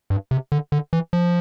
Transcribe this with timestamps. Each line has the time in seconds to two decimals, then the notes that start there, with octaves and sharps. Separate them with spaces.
0.10 G2
0.31 C3
0.52 D3
0.72 D3
0.93 E3
1.13 F3